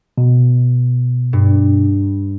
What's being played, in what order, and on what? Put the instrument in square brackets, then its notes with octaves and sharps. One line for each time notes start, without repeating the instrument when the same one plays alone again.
[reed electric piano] B2
[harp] G2